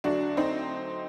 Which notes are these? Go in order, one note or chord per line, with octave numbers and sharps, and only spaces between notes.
D2 D3 F#3 A3 D4 F#4
C4 D#4